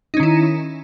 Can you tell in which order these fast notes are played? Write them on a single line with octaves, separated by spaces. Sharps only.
D#4 C#4 D#3 E4